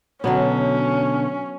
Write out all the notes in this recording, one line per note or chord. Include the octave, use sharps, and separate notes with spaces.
B2 D3 F#3 B3 C#4